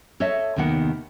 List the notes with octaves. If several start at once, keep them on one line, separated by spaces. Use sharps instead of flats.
A4 C#5 D#5 E5
D#2 C3 D#3 B3 F#5